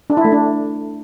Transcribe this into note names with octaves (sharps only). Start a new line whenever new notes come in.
D4
E4
A3
D4